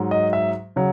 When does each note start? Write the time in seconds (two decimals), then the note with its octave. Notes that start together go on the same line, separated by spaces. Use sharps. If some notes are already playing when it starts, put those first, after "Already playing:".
Already playing: G#2 F#3
0.11 D#5
0.33 E5
0.76 C#3 F#3